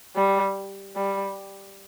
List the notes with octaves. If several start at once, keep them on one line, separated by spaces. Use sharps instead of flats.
G3
G3